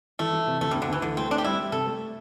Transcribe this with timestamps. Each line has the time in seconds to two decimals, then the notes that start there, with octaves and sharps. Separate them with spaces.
0.19 E3 A3
0.33 E3
0.47 C3
0.61 D2 A3
0.71 D2 G3
0.82 D3
0.88 D2 E3
1.02 D3 E3
1.17 A3 C4
1.30 C4 D4
1.38 G4
1.44 G3 E4
1.59 G3
1.72 C3 A4
1.86 A3